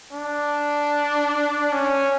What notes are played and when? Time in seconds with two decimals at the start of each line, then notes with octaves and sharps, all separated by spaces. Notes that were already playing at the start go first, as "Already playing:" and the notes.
0.13 D4
1.73 C#4